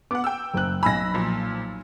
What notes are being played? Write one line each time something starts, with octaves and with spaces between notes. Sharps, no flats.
B3 F#5 D6
G5 E6
F#1 F#6
B1 D#5 G#5 B5 E6 A#6
A#2 F3